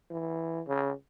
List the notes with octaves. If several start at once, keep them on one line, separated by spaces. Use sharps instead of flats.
E3
C#3